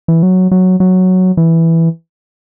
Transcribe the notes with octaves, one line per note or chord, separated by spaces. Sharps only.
E3
F#3
F#3
F#3
E3